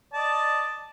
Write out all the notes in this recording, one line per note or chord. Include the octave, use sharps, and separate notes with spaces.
D5 D#5 A5